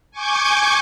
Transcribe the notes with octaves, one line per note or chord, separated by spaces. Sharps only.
G#5 C#6 D6 G6 G#6